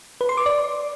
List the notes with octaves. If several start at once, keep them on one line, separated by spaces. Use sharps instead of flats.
B4
C6
D6
D5